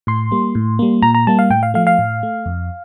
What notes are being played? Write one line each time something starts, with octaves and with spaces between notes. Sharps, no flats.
A2 C6
G3 A#3
A2
G3 A#3
A#2 A#5
A#5
G3 A#3 A5
F5
A2 G5
F5
F3 A3 F5
F5
A2
A3
F2